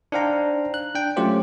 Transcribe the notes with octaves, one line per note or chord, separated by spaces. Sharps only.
D4 D#4 C5 F5 G5 A#5
F#6
D4 G5
F#3 A3 C#4 F4 G4 C5